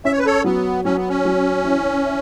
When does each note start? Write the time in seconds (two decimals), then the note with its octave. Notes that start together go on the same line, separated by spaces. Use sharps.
0.05 C#4 E5
0.12 C#5
0.19 B4
0.26 A4 C#5
0.44 F#3 B3
0.85 F#3 C#4
0.97 B3
1.09 C#4
1.25 F#3
1.64 E3
2.05 E4